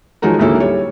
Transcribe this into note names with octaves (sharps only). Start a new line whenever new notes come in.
F3 F#3 G#3 D#4 F#4 A#4
D2 G#2 F#3 A#3 E4 A4
G3 C#5